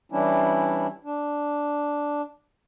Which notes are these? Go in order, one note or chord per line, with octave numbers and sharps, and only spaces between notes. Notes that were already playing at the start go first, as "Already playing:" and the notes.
E3 G3 C#4 D4 E4
D4